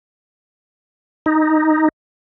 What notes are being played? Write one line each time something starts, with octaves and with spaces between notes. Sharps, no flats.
D#4